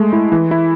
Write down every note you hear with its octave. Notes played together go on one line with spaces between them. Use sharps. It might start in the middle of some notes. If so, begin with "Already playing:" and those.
Already playing: G#3 A3
E4
E3
E4